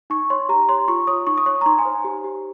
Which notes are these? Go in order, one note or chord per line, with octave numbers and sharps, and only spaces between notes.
D#4 C#6
C#5 C6
G4 A#5
C#5 C6
F4 C#6
C#5 D#6
D#4 C#6
D#6
C#5 C#6
A#5
D#4 C6
G#5
C5
G4
G4